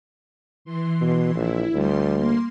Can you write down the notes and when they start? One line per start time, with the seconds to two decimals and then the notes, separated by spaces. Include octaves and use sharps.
0.65 E3 C6
1.01 B2
1.35 A#1 E4
1.74 D2 G3 C6
2.16 A#3 C6